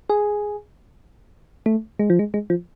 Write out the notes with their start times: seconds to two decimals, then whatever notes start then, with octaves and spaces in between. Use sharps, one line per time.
0.10 G#4
1.66 A3
1.99 G#3
2.10 F3
2.19 G#3
2.34 G#3
2.50 F3